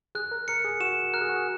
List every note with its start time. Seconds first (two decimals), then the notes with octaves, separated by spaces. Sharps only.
0.15 G#4 F#6
0.31 A#4
0.48 A#4 C#7
0.65 G#4
0.80 F#4 E7
1.14 A#4 F#6
1.21 G#4
1.29 F#4
1.36 G#4